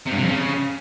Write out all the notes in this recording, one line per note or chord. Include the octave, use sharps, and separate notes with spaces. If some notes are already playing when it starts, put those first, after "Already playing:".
C3
G2
C3
F2
C#3